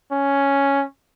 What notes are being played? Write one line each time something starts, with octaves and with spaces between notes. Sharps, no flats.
C#4